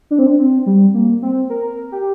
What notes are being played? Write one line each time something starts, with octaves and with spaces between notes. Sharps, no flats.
D4
C4
D4
C4
G3
A#3
C4
A#4
G4